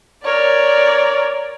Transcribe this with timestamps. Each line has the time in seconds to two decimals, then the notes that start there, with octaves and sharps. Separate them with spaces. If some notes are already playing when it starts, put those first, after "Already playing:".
0.25 A#4 C#5 D5